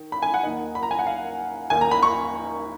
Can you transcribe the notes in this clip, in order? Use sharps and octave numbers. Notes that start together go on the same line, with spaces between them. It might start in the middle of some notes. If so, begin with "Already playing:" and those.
Already playing: D#3
B5
G#5
F#5
D#2 D#3 A#3 D#5
B5
A#5
G#5
F#5
F5
D#2 D#3 A#3 G#5
A#5
B5
C#6